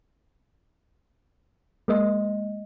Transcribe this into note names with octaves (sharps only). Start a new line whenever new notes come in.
G#3 A#3 D#5